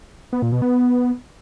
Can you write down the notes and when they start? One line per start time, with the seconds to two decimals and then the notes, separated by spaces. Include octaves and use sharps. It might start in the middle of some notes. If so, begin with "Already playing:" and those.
0.33 B3
0.42 A#2
0.52 B2
0.62 B3